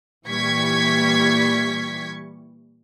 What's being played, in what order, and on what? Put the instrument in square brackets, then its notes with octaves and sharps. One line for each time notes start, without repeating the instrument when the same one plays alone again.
[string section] A#2 E3 G3 C#6 G#6 B6